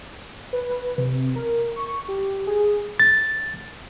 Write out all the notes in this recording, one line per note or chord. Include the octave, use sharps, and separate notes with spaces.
B4
C3
A#4
C#6
G4
G#4
A6